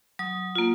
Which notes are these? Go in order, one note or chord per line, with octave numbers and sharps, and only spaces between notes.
F#3 D#6
A#3 F4